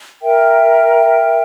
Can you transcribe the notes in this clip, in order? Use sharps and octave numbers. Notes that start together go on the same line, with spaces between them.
A#4 E5 G5